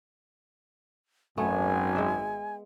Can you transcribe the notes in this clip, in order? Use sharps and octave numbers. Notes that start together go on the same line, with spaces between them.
G#1 F#2 A3 B3 G#5
G#3 E5